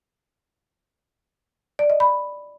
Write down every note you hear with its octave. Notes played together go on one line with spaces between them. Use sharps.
D5
D#5
B5